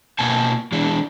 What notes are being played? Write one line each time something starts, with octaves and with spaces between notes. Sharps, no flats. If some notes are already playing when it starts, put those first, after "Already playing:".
B2 A#3 F#5 G#5 A5
E3 G#3 D4